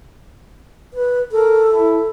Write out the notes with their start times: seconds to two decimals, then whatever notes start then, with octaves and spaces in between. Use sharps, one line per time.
0.94 B4
1.32 A4 A#4
1.70 E4